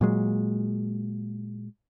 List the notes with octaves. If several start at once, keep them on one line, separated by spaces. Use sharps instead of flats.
A#2 F#3 G#3